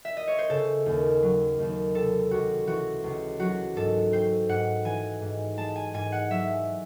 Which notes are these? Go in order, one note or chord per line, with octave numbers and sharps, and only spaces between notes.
E5
D#5
C#5
C5
C#3 A4
D#2
F#3
D#2
C3 A4
C#2 F#4
E3 F#4
C#2
F#3 F#4
G#2 A4
C4 C5
G#2 F#5
E3 G#5
G#2
G#3 A5
G#5
G#2 G#5
F#5
F#3 E5